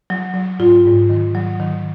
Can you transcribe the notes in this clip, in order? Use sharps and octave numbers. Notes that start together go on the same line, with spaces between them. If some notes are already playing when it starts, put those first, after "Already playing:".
F#3
F#3
G#2 F4
G#2
D#3
F#3
D#3